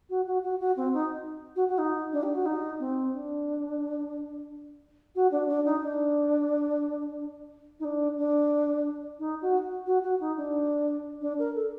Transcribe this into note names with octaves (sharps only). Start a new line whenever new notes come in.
F#4
F#4
F#4
F#4
C4
D#4
F#4
F#4
D#4
D4
G4
F#4
D#4
C4
D4
F#4
D4
D4
D#4
D4
D#4
D4
D4
D#4
F#4
F#4
F#4
D#4
D4
D4
A#4
A4